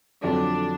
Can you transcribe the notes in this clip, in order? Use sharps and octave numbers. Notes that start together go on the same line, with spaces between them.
F2 D3 F#3 D4